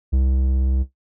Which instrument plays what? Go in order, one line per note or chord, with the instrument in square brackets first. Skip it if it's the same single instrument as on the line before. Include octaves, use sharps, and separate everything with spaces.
[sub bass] C2